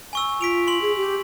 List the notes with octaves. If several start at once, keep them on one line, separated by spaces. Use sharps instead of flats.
G#5 C#6 E6
F4 B6 D7 F7
C6 F#7
G#4
G4